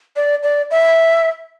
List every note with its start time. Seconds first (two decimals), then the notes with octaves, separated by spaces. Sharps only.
0.16 D5
0.43 D5
0.71 E5